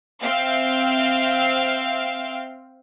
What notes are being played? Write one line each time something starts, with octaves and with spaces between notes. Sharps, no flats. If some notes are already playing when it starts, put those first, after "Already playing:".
C4 E5 F5 G5